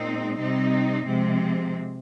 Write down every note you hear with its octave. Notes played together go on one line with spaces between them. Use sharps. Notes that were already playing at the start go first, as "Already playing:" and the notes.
Already playing: A#2 G#3 C4 D#4
C3 G3 C4 D#4
C3 F3 G#3 C4